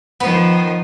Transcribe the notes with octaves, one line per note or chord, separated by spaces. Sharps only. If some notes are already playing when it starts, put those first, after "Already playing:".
D#3 F3 B3